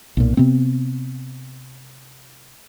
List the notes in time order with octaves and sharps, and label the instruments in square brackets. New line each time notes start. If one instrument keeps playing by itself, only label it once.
[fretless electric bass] B1 A#2
C3 B3 C4